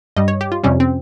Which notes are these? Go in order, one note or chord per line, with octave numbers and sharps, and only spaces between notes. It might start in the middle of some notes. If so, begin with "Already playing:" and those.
G2 G3 D#5
C#5
G4
F4
F2 C3 G3 C#4
C4